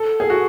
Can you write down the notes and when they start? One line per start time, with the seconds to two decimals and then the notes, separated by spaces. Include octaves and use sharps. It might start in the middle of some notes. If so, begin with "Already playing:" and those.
Already playing: A4
0.20 G#4
0.30 F#4